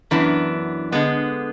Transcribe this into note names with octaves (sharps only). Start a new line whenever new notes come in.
F#2 E3 B3 D4
D3 G#3 B3